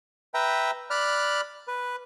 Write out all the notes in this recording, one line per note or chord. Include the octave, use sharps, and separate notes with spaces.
B4 E5 G5 A#5
D5 B5 F6 F#6
B4